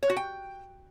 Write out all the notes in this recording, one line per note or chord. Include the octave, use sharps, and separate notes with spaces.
C#5
F#4
G5